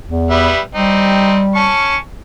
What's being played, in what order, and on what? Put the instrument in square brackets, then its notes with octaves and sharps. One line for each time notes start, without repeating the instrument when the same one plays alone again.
[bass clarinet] E2
[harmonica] G3 B3 E5
[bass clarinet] G3 [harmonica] C4 D#4 G4
[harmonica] C#4 A5 C#6